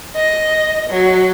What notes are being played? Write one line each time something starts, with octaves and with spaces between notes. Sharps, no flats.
D#5 A#6
F#3